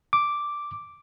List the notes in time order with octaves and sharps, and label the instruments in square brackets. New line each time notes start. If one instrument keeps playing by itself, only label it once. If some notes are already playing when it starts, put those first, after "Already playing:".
[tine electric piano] D6